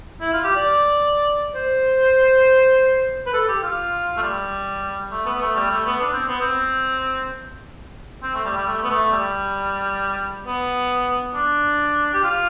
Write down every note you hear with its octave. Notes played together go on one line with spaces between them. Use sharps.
E4
F4
G4
D5
C5
B4
A4
G4
F4
A3
G3
A3
B3
A3
G3
A3
B3
D4
C4
B3
C4
C4
A3
G3
G3
A3
B3
A3
G3
B3
D4
G4
F4